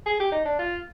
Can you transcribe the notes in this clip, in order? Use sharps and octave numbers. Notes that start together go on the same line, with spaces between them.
G#4
G4
D#4
D4
F4